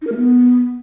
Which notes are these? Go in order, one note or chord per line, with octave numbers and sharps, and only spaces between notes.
D#4
A#4
A3
B3